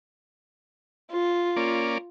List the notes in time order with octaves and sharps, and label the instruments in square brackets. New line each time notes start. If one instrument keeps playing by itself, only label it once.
[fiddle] F4
[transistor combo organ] A#3 C#4 D5